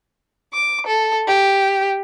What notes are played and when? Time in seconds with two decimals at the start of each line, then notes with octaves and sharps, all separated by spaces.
0.53 D6
0.87 A4
1.27 G4